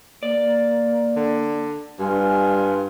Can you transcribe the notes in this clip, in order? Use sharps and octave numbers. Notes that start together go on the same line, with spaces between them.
A#3 D5
D3
G2 G3 F4 G#5